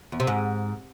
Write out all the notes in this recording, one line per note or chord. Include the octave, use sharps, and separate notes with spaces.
E2
C3
G#2